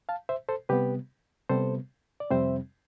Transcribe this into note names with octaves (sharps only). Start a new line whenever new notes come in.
F5 A5
C5 E5
A4 C5
C3 G3 B3 G4 B4
C3 G3 B3 A4 C5
D5
F2 C3 G3 C4 C5 E5